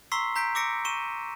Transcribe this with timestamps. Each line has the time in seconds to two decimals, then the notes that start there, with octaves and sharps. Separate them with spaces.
0.12 A#5 C6 C#6 E6 B6 C7
0.36 A#5 G6 B6 D7
0.55 D6 E6 A#6 C#7 D7
0.85 C#6 D#7 E7